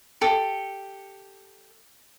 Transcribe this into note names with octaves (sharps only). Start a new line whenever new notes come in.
G4 A4